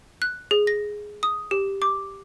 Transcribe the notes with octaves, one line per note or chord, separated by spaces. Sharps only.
F#6
G#4
A#6
D#6
G4
D6